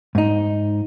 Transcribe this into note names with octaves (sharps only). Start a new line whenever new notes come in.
G#2 D#4